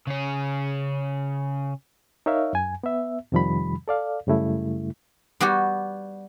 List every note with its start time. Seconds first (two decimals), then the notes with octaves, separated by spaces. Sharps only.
0.07 C#3 C#4
2.26 D#4 A#4 C#5 E5 F5
2.53 F#2 G#5
2.84 B3 E5
3.32 F2 C3 D#3 F3 G3 B5
3.88 A4 D5 F5
4.27 F#2 C#3 G3 A3 E4
5.41 G3 B3 F#4 G4